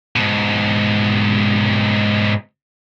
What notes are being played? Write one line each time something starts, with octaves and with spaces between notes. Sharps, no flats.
G#2 B2